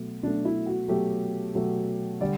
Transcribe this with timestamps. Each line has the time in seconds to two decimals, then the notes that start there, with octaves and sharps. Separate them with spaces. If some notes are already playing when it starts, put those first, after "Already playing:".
Already playing: B2 F#3 A3
0.23 B2 F#3 A3 D4
0.45 E4
0.66 F#4
0.88 B2 F#3 A3 G4
1.55 B2 F#3 A3
2.21 D3 G3 D5